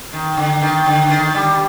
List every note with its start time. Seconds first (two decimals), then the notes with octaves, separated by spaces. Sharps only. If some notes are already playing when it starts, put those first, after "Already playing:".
0.13 D#3
0.37 D3
0.61 D#3
0.86 D3
1.10 D#3
1.35 G3